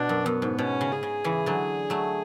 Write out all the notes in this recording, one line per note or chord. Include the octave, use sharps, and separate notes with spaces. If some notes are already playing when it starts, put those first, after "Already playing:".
Already playing: B2 D4
F#2
F#2 B3
G#2
B2 C#4
C#3
G#4
C#3
C#3 E3
D3 F#3
F#3 A3